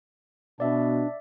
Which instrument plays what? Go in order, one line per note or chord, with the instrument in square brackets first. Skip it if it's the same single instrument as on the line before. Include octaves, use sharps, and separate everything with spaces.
[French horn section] B2 [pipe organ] D4 [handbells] D5 E5